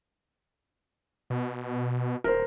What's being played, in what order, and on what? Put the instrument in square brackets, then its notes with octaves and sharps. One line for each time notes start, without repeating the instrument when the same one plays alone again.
[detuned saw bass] B2
[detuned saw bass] D#1 [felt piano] A#4 C5